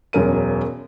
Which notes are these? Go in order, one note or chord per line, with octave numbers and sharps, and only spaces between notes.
E1 F#2 A#4 D#7